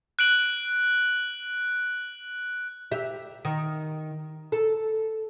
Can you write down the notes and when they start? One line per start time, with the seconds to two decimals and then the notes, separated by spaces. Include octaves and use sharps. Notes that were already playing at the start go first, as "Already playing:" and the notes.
0.19 F#6 D7 F#7
2.92 G4 E5
3.45 D#3
4.52 A4